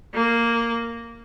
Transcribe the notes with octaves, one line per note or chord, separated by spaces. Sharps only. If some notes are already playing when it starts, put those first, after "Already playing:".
A#3